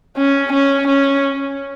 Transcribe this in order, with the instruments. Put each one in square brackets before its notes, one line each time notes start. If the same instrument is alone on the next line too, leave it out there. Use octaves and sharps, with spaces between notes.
[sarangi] C#4
C#4
C#4